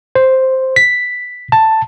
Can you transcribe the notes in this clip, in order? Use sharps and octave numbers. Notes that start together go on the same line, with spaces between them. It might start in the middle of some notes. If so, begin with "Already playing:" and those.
C5
B6
A5